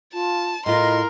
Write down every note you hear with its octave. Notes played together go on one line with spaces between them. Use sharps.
F4 A5
A2 F4 A#4 D#5 C6